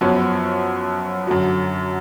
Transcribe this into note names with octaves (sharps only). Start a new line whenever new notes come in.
F#2 F3 B3 F#4 C#5
F#2 D3 F#3